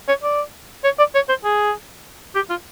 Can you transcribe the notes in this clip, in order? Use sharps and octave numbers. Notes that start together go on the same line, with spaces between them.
C#5
D5
C#5
D5
C#5
C5
G#4
G4
F4